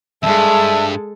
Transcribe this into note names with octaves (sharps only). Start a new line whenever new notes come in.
E2 G2 G#3 A4 E5 A5